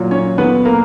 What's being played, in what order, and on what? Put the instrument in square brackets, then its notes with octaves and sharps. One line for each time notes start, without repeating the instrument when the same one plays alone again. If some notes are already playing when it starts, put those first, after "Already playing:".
Already playing: [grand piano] A#2 F#3
C#4 C#5
B3 B4
A#3 A#4